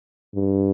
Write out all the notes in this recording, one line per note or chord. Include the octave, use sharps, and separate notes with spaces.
G2